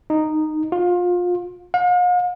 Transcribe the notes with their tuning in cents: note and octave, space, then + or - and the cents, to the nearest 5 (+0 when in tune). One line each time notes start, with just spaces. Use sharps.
D#4 -10
F4 +25
F5 +45